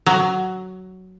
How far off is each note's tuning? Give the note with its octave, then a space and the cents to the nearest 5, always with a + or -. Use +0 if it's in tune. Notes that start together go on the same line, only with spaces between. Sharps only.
F#3 +10